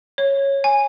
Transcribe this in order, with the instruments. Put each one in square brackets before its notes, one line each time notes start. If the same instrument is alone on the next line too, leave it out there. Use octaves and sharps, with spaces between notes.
[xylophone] C#5
G#5